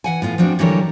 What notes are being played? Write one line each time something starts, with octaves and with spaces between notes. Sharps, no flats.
E3 F#5 G#5
A2 B3 F4
F3 B3 C4 D4 F#4
D3 E3 F#3 G3 A#4 C#5